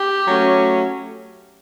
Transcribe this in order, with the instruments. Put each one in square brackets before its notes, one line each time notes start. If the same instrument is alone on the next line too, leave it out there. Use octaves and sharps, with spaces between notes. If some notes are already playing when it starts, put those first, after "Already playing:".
Already playing: [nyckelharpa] G4
[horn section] F#3 A3 C#4